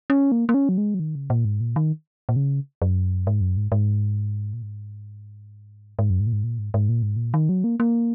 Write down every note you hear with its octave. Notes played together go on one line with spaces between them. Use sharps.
C#4
A#3
A#3
C#4
F#3
G#3
F#3
D#3
C#3
A#2
G#2
A#2
D#3
A#2
C#3
F#2
G#2
F#2
G#2
G#2
A#2
G#2
G#2
F#2
G#2
A#2
G#2
A#2
G#2
G#2
A#2
G#2
A#2
D#3
F#3
A#3
A#3